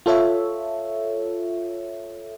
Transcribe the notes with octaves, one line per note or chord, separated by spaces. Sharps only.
F4 A4 C#5 E5